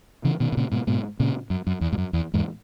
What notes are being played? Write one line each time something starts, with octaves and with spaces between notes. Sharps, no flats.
C#3 E3
B2 D#3
B2
A#2 C#3
G#2 B2
G#2 B2
A#2 C#3
F#2
F#2
E2
G#2
F#2
E2
E2 G#2